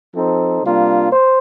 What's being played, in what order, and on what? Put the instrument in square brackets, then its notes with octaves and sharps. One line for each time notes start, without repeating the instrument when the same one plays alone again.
[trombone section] F3 C4 D#4 A4 C5
C3 G3 A#3 D4 F4
C5